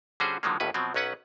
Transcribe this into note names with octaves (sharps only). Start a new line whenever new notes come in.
D3 G3 C#4 F#4 G#4 C5
D3 D#3 F3 F#3 G#3 A#3
G1 D#2 A2 C#4 B4
B2 F3 F#3 C4
B1 F#3 C#4 B4 F#5